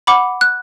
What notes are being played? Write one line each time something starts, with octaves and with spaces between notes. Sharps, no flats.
F#5 B5 D6
F#6